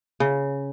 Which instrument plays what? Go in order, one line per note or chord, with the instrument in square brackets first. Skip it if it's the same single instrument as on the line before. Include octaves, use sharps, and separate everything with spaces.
[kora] C#3